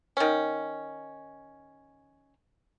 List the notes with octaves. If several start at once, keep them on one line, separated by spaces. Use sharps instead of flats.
D#3 C#4